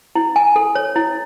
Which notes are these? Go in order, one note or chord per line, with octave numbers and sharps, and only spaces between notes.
E4
G#5
A4
C#5
E4